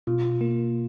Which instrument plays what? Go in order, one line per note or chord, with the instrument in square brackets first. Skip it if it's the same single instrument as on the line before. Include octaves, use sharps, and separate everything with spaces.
[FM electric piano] B2 [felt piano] F4
[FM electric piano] A#3